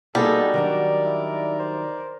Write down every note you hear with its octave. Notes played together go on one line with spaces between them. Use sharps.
G3 G#3 A#3 B3 D#4 F#4 G#4 A4
D#3 F#3 D4 D#4 A#4 D5
E4
C5